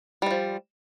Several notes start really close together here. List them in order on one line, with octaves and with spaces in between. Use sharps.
G3 E3 F3